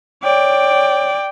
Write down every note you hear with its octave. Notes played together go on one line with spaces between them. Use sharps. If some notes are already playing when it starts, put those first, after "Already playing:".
C#5 D5 G5